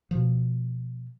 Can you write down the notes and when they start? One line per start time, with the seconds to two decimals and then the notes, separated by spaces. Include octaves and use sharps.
0.11 B2 F3